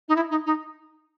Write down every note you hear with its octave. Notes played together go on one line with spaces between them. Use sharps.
D#4
E4
D#4
D#4